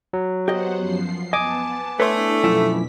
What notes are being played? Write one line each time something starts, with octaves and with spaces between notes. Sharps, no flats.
F#3
B3 G4 C5 D#5 F#5
F#2 F3 C7
B3 D#5 G#5 A5 D6
A3 D4 E4 B4 C#5 C6
F#2 B2 F3 E4 B6